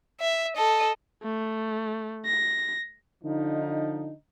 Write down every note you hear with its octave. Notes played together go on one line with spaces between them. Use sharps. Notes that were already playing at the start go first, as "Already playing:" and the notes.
E5
A4 D#5
A3
A#6
D3 F3 D#4